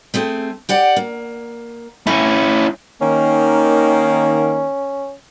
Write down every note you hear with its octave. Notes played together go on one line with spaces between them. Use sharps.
A3 C4 G#4
G4 D5 F#5
A#3
A3 C#4 E4
D#3 A#3 C#4